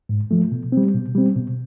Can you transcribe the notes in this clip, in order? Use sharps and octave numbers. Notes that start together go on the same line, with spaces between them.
G#2
F3 A3
B2
G3 C4
B2
G3 C4
B2